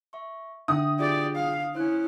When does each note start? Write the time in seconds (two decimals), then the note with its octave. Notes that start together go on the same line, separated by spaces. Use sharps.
0.13 E5 C#6
0.68 D3 E5 G5 D#6
0.99 F4 G4 G#4 D5 G5
1.36 F5
1.75 C#4 E4 C5 F#6